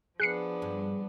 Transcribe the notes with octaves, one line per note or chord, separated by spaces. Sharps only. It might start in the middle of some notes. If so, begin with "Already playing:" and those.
F3 B3 D4 G#4 F#6 C7 C#7
G2